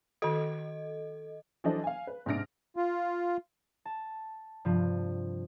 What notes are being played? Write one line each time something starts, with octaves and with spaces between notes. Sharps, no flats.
D#3 F#4 A4 D#5
E3 F#3 D4 A4 C5 D#5
F5 G#5
B4
G#2 C3 D4 F6 A#6 D7
F4
A5
G2 C3 F3